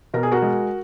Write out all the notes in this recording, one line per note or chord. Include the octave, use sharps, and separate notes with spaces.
B2 A#4
G#4
F#4 A#4
G#3